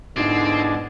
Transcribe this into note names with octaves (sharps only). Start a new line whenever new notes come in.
G#2 B2 D3 G#3 C4 D4 E4